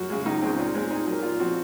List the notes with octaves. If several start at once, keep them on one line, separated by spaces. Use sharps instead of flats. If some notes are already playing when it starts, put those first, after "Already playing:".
Already playing: F#2 F#4
C#3 G#3
C#2 D#4
C#3 G#3 C4
A#2
G#3 C4
A#2 D#4
F#3 A#3
A#2 F4
F3 C4 F#4